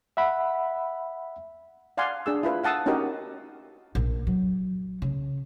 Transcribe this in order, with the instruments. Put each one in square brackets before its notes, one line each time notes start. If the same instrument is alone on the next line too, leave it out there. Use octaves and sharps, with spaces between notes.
[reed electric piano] E5 F#5 B5
[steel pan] D5 F5 F#5 G#5 C6
D4 G#4 E6
E4 F4 B4
F5 F#5 A5 D#6 E6
C#4 D#4 F#4 G4 A#4 D#5
[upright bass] A#1
F#3
C#3